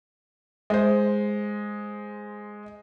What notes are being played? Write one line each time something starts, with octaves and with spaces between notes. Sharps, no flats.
G#3 C5